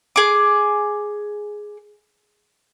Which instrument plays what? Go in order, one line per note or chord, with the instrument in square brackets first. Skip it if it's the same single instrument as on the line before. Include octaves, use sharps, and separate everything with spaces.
[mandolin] G#4 D6